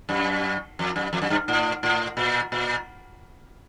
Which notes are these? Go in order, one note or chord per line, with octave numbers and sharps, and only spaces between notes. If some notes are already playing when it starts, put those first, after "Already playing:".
F#2
F2
F#2
F2
F#2
G2
A2
A2
A#2
A#2